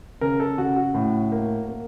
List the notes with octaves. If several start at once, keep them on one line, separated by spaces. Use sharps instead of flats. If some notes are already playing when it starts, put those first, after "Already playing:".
C#3 A#4
A4
C#3 F#4
F#4
A2
A#3
A#3